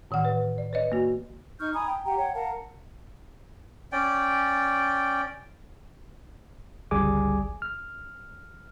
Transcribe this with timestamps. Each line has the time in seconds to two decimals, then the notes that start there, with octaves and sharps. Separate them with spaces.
0.11 A2 D#3 E3 F#5 F6
0.25 B4
0.58 D5
0.73 B4 C#5 D#5
0.92 A#3 F#4
1.60 D#4 C#6 F6 G6
1.74 G#5 A#5 B5 D#6
1.86 G5
2.05 G4 F#5 G5 A#5
2.18 C#5 F#5 G5
2.34 A#4 F5 F#5 A5
3.92 C#4 D5 G5
6.91 G1 C#2 G3 G#4 G#5 D6
7.62 F6